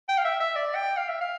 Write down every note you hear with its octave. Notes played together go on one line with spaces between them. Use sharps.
G5
F5
E5
E5
D5
G5
F5
E5
F5